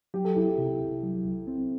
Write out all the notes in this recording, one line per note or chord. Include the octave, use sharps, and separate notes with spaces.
F#3 G4
A4
C2 E4 G4
C3
C2
F#3
C2
C4